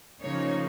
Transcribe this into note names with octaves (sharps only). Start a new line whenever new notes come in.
C#3 F3 A#3 D#4 C#5